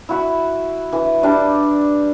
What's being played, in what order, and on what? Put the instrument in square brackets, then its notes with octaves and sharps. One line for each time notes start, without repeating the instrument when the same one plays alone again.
[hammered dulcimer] E4 F#4 B5
E3
G3 D4 D5